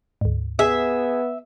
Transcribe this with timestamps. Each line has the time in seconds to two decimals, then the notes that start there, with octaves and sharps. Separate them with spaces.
0.21 D2 G#2
0.59 B3 G#4 E5